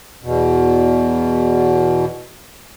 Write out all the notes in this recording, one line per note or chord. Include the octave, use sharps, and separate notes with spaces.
E2 B2